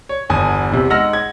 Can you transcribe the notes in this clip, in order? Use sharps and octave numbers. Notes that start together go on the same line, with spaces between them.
C#5
G1 E2 G#5 A5 D#6
E2 C3
G#3 D#4 F#5 E6 F6 A#6
G#6